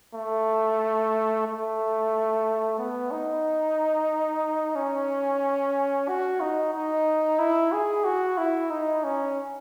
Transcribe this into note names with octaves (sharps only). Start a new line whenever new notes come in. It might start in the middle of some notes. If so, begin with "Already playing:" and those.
A3
A3
B3
D#4
C#4
F#4
D#4
D#4
E4
G#4
F#4
E4
D#4
C#4